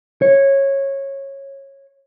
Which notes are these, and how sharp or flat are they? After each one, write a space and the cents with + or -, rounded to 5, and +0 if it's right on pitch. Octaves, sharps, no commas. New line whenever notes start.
C#5 -15